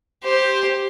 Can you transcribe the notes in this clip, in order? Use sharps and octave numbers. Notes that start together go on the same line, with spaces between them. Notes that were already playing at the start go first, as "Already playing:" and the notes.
G4 C5